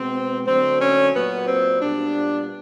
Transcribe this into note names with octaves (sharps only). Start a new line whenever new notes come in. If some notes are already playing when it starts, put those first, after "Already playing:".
Already playing: B2 G#3 B3 C4
D3 F#3 A3 C4
C#4
A#2 F#3 A#3 B3
C4
A#2 G3 B3 D4